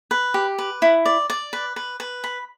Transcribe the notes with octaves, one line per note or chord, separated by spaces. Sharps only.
B4
G4
B4
E4
D5
D5
B4
B4
B4
B5